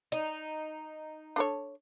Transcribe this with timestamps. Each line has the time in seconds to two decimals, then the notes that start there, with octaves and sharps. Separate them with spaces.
0.12 D#4
1.36 D4 A4 C#5